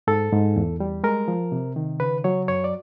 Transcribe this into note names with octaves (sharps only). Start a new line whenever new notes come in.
G#2 A4
G#2
E2
G3
G#3 A#4
F3
C3
D#3
C#3 B4
F#3 C#5
F#2 C#5
D5